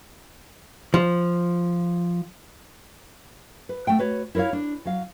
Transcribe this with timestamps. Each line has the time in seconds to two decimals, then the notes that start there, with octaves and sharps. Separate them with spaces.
0.94 F3
3.69 B4
3.87 A3 F#5 G5
3.99 F#4 B4 C#5
4.35 E4 A#4 C5 C#5 F5
4.53 D4
4.85 F#3 F5